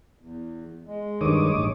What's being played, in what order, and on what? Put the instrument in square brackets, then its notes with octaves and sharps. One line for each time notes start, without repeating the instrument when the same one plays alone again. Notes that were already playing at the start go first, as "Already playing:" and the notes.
[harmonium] E2
G#3
[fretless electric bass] G2 D#3 [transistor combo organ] C#5 D6 D#6
[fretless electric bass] A1